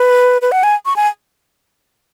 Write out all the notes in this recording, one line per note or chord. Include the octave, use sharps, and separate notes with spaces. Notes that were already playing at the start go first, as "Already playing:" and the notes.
Already playing: B4
B4
F#5
G#5
C#6
G#5